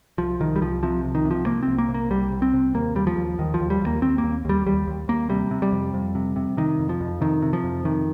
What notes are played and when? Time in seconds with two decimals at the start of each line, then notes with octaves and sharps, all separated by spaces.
0.18 C2 F3
0.40 C2 D#3
0.56 G3
0.61 C2 F3
0.83 C3 F3
1.05 C2
1.15 D#3
1.25 C3
1.31 F3
1.46 C3 A#3
1.63 C2 C4
1.78 A#3
1.88 C3
1.94 A#3
2.10 C2 G3
2.32 C2
2.42 C4
2.53 C3
2.74 D#2 A#3
2.95 D#2 G3
3.07 F3
3.17 D#2
3.39 D#2 D#3
3.54 F3
3.60 D#2
3.70 G3
3.81 D#2
3.87 A#3
4.02 D#2 C4
4.18 A#3
4.24 D#2
4.45 D#2 G3
4.66 D#2 G3
4.87 D#2
5.08 D#2 A#3
5.29 C3 G3
5.51 C3
5.62 G3
5.72 F2
5.94 F2
6.15 C3
6.36 C3
6.57 C3 D#3
6.79 F2
6.89 F3
7.00 F2
7.21 C3 D#3
7.42 C3
7.53 F3
7.64 F2
7.85 C3 D#3